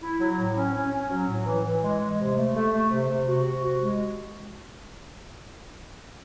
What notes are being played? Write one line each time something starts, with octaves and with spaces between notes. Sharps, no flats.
E4
F#3
A2
C#4
C#4
C#4
F#3
A2
E3
E3
G#3
G#3
C3
A3
A3
A3
C3
C3
F#4
C3
F#4
G#3